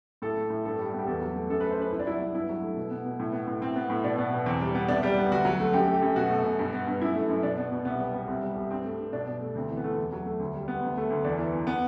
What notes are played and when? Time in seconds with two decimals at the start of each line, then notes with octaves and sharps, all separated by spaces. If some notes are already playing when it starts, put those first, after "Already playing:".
0.22 A2 A4
0.37 A3
0.50 A2
0.65 G2 A4
0.79 G3
0.94 B3
0.99 G4
1.07 E2 A4
1.21 F#3
1.36 A3
1.49 F#2 A4
1.60 A3 B4
1.71 C5
1.78 F#2 B4
1.92 C2 E4
2.00 D4
2.06 F#3 E4
2.21 B3
2.34 G2 E4
2.49 F#3
2.62 A3
2.77 B2
2.91 B3
3.06 B2
3.20 A2
3.33 B3
3.47 A2
3.61 A2 C4
3.76 B3
3.90 A2
4.04 B2 D4
4.18 B3
4.32 B2
4.46 E2 C4
4.61 G3
4.75 B3
4.89 C2 D4
5.03 G3
5.17 B3
5.31 D2 F#4
5.45 F#3
5.60 A3
5.73 F#2 G4
5.88 A3
5.94 G4
6.02 F#2
6.16 B2 F#4
6.30 A3
6.44 B2
6.59 G2
6.73 B3
6.87 G2
7.01 F#2 E4
7.16 A3
7.29 F#2
7.43 B2 D4
7.58 B3
7.72 B2
7.85 C2 B3
8.00 G3
8.14 B3
8.28 C2 C4
8.43 G3
8.56 C2
8.70 G2 C4
8.84 A3
8.98 G2
9.12 B2 D4
9.28 B2
9.41 A3
9.55 D2 C4
9.70 E3
9.77 B3
9.84 A3
9.98 E2
10.12 F#3
10.26 A3
10.40 D2
10.54 G3
10.68 B3
10.83 D2
10.97 A3
11.10 D2
11.24 E2 D4
11.39 E3
11.54 E2
11.67 B3